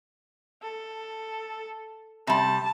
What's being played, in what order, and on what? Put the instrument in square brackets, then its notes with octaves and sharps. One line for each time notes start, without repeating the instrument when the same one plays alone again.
[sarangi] A4
[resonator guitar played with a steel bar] C3 G3 [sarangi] A5